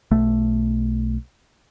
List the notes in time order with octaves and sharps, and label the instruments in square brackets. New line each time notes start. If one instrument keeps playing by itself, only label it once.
[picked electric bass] B1 A3